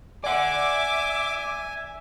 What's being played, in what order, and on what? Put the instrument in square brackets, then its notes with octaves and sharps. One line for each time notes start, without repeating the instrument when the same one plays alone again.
[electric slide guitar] D5 F#5 [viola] E5 [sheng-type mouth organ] G#5 [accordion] D6